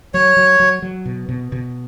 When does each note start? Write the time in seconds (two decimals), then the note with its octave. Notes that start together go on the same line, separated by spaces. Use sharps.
0.14 F#3 C#5
0.37 F#3
0.60 F#3
0.82 F#3
1.06 B2
1.29 B2
1.52 B2